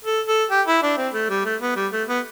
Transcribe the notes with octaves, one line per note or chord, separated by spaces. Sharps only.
A4
A4
G4
E4
D4
C4
A3
G3
A3
B3
G3
A3
B3